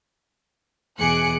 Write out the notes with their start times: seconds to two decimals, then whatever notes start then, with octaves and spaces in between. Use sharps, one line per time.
0.98 E2 B2 G#4 D6 F#6 C#7